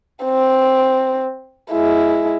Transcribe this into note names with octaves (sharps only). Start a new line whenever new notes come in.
C4
G#3 E4